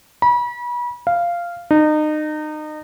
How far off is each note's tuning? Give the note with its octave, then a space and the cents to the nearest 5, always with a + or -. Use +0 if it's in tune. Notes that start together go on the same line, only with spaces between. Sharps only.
B5 -35
F5 -10
D#4 -30